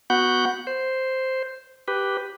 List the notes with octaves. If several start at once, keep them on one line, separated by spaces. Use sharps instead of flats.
B3 F#4 F#5 G6
C5
G4 B4